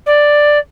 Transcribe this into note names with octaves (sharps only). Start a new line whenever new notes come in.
D5